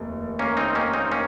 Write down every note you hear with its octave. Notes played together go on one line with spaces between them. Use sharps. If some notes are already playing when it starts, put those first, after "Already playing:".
Already playing: F1 D#2
A#3 C#4
C4 D#4
A#3 C#4
C4 D#4
A#3 C#4